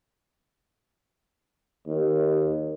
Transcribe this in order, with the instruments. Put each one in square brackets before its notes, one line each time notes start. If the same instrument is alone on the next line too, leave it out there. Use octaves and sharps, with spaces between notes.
[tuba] D#2